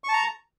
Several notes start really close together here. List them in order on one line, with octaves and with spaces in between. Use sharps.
C#6 A5 A#5